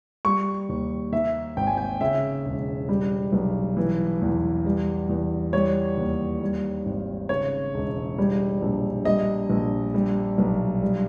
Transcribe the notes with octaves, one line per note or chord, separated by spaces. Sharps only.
G3 C#6
D#2
D#3 E5
G#1 G5
G#5
G5
C#3 E5
E1
G3
B1
E3
E2
G3
E2
G3 C#5
D#2
G3
G#1
C#3 C#5
E1
G3
A#1
G3 D#5
A#1
G3
B1
G3